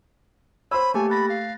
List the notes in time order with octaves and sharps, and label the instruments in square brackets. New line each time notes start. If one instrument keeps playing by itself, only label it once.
[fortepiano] C5 E6 [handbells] C#5 [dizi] B5
[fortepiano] A3 [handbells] A#3 G4 [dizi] G#5
[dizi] B5 [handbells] F#6 A6 A#6
[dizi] F5